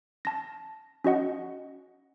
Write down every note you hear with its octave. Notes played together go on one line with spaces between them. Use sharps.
A5 A#6
C#4 F#4 D#5 F#5